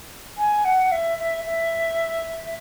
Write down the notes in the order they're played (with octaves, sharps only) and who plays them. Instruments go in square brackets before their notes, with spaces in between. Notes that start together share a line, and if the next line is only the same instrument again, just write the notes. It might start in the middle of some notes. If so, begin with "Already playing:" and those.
[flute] G#5
F#5
E5
E5
E5